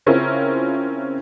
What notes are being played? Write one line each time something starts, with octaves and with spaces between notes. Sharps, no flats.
C#3 C4 C#4 E4 F4 A#4